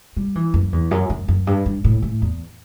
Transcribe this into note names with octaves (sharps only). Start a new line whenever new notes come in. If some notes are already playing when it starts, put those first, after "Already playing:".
G3
E3
F#2
E2
F#2
F#2
F#2
G2
G2
A2
A2
E2